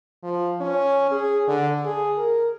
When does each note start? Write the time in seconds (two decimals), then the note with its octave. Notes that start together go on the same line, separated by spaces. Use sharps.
0.23 F3
0.60 C#4
1.11 G#4
1.48 D3
1.85 G#4
2.17 A#4